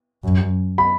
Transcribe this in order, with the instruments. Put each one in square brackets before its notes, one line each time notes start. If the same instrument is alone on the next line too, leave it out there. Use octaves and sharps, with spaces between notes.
[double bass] F#2
[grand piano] B5